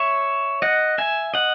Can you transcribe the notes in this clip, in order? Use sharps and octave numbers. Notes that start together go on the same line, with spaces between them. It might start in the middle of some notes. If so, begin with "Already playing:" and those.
Already playing: C#5 E5
D#5 F#5
E5 G#5
D#5 F#5